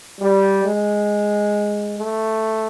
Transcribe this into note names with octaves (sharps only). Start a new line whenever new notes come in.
G3
G#3
A3